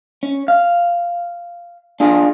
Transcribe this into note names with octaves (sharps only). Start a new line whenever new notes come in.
C#4
F5
D4 F4 G#4